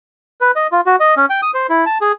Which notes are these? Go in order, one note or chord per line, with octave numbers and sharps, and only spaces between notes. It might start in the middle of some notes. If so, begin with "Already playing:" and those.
B4
D#5
F4
F#4
D#5
C#4
G5
D#6
C5
E4
A5
G#4